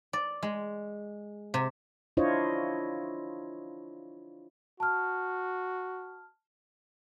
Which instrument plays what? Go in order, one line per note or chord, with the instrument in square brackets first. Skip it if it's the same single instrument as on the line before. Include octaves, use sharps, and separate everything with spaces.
[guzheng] D5
G#3
C3
[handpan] D4 E4 F4 C5 C#5 D#5
[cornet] F#4 [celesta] A5 F6